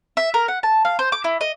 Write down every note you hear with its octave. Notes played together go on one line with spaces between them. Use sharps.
E5
A#4
F#5
A5
F5
C5
D6
E4
D#5